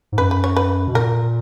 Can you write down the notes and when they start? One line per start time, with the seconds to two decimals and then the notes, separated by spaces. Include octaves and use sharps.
0.12 G#2
0.18 F#2 B4
0.31 B4
0.44 C#5
0.56 B4
0.88 B2
0.95 A#2 A#4